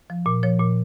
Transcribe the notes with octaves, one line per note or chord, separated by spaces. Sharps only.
F3
A#2
F3 C#5
A#2